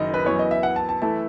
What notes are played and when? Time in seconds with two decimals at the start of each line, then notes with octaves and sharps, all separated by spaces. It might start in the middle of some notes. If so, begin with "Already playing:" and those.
Already playing: F#1 F#2 D#3 D#5
0.14 B4
0.25 F#2 E3 B3 C#5
0.39 D#5
0.51 E5
0.63 F#5
0.76 A5
0.89 A5
1.02 E3 A3 E4 A5